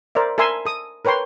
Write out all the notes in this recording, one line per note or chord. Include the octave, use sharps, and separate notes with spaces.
A#4 C5 D5 E5
A4 A#4 E5 G#5 C6 E6
A4 D#6
A#4 B4 C#5 G5 C6